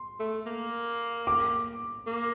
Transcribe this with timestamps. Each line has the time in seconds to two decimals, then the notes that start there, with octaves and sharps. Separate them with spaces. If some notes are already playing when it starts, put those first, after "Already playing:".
Already playing: C6
0.20 A3
0.46 A#3
1.27 D6
2.07 A#3